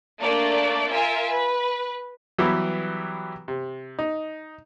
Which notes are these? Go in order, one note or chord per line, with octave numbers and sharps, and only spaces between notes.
A3 A#3 D4 D5
F4 A#4 E5 G#5
B4
E3 F#3 G3 B3 E4 G4
C3
D#4